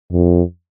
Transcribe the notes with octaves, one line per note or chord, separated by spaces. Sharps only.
F2